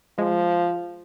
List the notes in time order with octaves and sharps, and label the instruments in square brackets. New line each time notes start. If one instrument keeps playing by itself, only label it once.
[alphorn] F3 [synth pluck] G#3